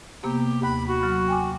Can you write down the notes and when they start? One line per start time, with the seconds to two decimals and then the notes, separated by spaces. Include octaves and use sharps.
0.23 C3 A#3 B3 G4
0.63 D#2 B5 F#6
0.87 F#4 B5
1.02 F#3 F6
1.28 G5 G#5 D6